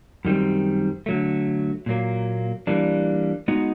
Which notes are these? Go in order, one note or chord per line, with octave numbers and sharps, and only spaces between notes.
F#2 D#3 G3 C4
D3 F#3 A3
A#2 F#3 A#3
E3 G3 A#3 D4
G#3 B3 D#4 F#4